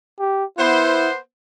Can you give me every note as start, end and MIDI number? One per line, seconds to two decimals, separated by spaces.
0.19 0.45 67
0.58 1.17 59
0.58 1.09 64
0.58 1.17 72